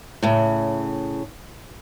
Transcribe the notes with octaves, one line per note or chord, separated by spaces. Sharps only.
A2 C#3